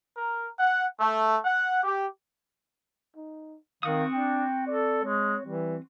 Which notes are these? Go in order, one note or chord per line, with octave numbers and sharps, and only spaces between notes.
A#4
F#5
A3
F#5
G4
D#4
D#3 C4 F#4 F5 D#6
D4 G5
A4 D5
G#3 C#5
E3 G3